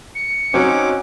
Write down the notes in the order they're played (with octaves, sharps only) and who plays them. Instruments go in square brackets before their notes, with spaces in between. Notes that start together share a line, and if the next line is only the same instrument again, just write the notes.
[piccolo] C#7
[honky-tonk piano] F#3 C4 [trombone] C#4 [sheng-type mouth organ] D#4 F#5 D6